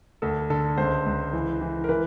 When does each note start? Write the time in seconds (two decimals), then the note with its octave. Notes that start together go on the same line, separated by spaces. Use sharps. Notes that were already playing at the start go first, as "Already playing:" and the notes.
0.22 D2 A4
0.50 D3 A4
0.77 C#2 C5
1.06 C#2
1.33 E3
1.61 E3
1.84 A#4
1.89 E3 B4